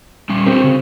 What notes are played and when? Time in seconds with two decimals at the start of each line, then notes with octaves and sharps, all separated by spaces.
0.29 G3 C#4
0.46 C4 D4 F#4 G4
0.64 C#3